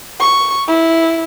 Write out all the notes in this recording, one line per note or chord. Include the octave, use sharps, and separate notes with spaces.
C#6
E4